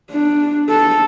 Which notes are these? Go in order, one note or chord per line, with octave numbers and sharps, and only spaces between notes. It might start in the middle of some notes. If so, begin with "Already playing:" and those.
D4
A4